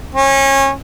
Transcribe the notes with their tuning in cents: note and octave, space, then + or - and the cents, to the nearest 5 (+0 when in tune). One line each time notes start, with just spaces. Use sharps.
C#4 -25